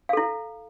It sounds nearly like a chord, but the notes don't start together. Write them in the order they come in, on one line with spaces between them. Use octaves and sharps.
F5 A4 E4